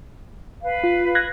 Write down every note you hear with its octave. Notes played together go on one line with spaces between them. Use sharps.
B4 F5
F4
F#6 G#6 A#6